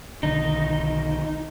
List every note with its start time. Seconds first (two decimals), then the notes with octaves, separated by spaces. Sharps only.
0.23 B1 D3 D#3 D#4